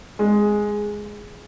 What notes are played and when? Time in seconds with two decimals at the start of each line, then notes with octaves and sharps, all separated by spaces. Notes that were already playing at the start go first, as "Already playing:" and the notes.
0.19 G#3